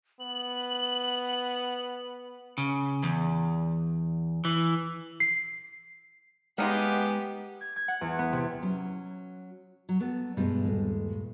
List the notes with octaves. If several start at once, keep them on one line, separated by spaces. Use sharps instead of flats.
B3 F#7
C#3
E2
E3
C7
G#3 A#3 B3 D#4 G4 G#4 C6
G#6
G#6
F#5
E2
B3
C3
F#3 C#4
F#3
A3 B3
G2 B2 G#3 A3
D#1